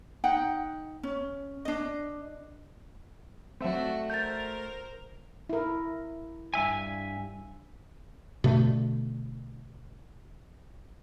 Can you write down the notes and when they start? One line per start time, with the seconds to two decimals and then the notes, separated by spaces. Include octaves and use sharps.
0.24 D#4 F#5 G5
1.03 C#4
1.65 D4 D#5
3.61 F#3 A3 C4 D4 F#4 E5
4.10 A#4 C5 G6 A6
5.49 E4 A#4
6.54 G2 E5 G#5
8.44 B2 D3 A3